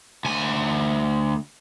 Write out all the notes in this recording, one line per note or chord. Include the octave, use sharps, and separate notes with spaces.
D2 G#5